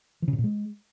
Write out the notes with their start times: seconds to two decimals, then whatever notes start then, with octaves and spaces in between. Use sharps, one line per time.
0.22 E3
0.28 C#3
0.33 B2
0.38 A#2
0.44 G#3